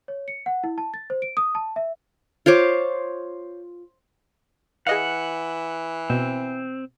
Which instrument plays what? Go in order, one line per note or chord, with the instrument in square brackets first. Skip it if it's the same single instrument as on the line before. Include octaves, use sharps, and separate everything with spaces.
[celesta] C#5
C#7
F#5
E4
A5
A6
C5
D7
D#6
A5
E5
[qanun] F4 C5 C#5 D6
[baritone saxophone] E3 [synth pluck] G#4 D#5 F5 [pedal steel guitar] F#5
[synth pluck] B2 [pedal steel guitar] C4